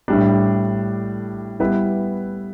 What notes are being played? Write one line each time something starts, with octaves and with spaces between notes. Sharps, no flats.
A2 G3 D4
G3 B3 E4 B4